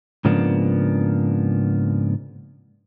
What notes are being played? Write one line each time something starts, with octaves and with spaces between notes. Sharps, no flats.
G#2 C#3 F3 A#3 B3 D4